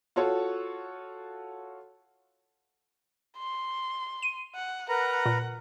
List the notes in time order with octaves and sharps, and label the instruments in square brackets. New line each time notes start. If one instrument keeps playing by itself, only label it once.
[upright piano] F4 F#4 A4 C#5
[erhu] C6
[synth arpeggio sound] D#7
[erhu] F#5
[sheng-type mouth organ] A#4 B4 A#5 [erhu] F#5
[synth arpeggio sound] A#2